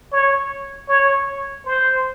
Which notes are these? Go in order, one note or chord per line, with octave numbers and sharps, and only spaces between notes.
C#5
C#5
C5